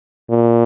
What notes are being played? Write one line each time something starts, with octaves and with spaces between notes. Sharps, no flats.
A#2